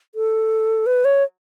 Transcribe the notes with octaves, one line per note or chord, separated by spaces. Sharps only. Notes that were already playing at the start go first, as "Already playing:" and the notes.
A4
B4
C#5